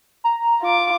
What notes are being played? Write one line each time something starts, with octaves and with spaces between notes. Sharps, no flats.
A#5
F4 D6